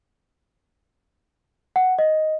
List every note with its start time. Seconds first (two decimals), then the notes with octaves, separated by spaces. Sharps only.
1.76 F#5
1.99 D#5